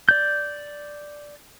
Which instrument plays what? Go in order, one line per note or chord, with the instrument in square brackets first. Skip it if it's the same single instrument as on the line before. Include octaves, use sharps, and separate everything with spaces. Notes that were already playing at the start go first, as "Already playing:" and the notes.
[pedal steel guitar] D5 G6